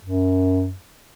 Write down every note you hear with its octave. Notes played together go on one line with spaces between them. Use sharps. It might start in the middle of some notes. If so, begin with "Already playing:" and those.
F#2